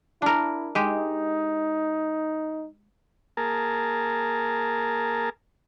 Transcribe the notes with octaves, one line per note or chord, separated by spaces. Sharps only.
D4 E4 A#4
G#3 D#4 G4
A#3 G#4 A#4 A5